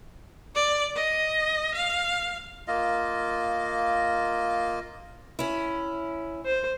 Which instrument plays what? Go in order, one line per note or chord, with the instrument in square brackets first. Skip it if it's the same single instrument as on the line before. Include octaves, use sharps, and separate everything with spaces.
[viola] D5
D#5
F5
[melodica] A#3 F4 D#5
[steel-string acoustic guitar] C#4 E4
[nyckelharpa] C5